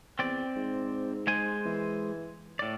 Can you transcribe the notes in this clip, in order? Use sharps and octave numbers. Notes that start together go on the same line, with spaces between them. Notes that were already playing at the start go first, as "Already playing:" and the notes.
E2 C4 D5
G#2
G#3 C5 G#5
E3
A2 D5